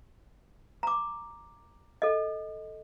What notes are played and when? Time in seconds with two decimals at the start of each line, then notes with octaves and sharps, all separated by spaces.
0.83 A#5 D6
2.02 A4 D#5